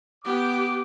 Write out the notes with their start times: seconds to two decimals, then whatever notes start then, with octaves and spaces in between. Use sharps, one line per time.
0.24 B3 G4 D6